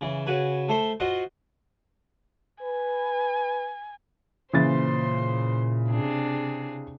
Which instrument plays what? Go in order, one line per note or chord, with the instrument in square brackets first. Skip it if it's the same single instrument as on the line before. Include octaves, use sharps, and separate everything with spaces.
[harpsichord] C#3 E3
C#3 F#4 B4 G#5
A3 A4 C5 B5 C6
F4 F#4 C5 D#5 F#5
[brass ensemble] B4 [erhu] G#5
[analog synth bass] A#2 [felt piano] C#3 E3 A6 [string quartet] C5 C6
[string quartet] C3 D4 G#4